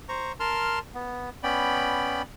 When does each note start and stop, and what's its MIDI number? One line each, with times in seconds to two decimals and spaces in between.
0.09 0.32 72
0.09 0.32 82
0.09 0.32 85
0.40 0.79 70
0.40 0.79 81
0.40 0.79 84
0.40 0.79 89
0.95 1.30 59
1.43 2.22 59
1.43 2.22 61
1.43 2.22 74
1.43 2.22 79
1.43 2.22 83